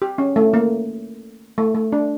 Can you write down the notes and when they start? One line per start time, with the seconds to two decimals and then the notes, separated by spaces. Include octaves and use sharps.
0.02 G4
0.18 C#4
0.36 A3
0.54 A#3
1.58 A3
1.75 A3
1.92 D4